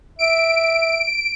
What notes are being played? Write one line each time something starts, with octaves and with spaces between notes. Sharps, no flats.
E5 D7